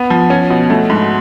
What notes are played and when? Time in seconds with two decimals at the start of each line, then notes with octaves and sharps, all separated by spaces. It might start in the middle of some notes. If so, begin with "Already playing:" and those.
Already playing: B3
0.10 F3
0.30 C#4
0.50 B2
0.70 A3
0.90 G#2